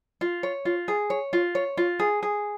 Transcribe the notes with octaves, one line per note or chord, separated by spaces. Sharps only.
F4
C#5
F4
G#4
C#5
F4
C#5
F4
G#4
G#4